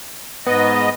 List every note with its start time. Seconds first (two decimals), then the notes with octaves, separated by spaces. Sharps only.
0.46 G#2 B3 D#5